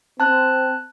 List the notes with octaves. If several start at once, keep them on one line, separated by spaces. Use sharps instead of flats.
C4 A5 F#6